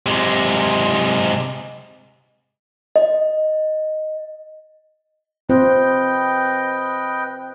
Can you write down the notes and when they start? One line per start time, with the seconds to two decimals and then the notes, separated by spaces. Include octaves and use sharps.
0.06 C3 G#3
2.96 D#5
5.49 C4 F4 B4 C5 D#5 G5